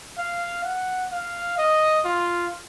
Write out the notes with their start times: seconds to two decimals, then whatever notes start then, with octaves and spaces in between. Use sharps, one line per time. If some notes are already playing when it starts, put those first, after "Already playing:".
0.18 F5
0.64 F#5
1.11 F5
1.58 D#5
2.05 F4